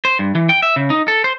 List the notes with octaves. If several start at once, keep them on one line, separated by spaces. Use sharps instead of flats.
C5
G2
E3
G5
E5
C#3
D#4
A4
C5